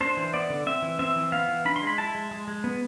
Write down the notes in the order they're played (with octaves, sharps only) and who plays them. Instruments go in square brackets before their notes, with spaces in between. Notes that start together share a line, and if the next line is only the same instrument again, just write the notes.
[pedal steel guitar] D4 C5
E3
B3 D5
D3
C4 E5
E3
C4 E5
E3
B3 F5
E3
D4 B5
C6
G#3
B5
E4 A5
G#3
G#3
G#3
B3